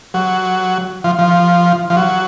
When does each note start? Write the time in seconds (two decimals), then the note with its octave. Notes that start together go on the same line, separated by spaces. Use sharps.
0.14 F#3
1.04 F3
1.19 F3
1.90 F3
1.97 F#3